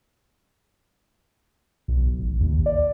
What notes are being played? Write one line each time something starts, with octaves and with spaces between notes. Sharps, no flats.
B1
A1
D#2
D5